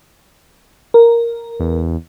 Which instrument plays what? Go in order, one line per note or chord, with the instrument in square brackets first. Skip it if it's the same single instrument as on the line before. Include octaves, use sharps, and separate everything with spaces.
[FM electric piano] A#4
[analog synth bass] E2